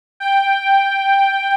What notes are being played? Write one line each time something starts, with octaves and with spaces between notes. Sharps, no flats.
G5